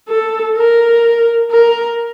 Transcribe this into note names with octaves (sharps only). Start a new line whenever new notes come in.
A4
A#4
A#4